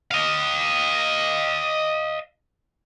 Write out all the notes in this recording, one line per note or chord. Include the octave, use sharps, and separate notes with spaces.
D#5 F5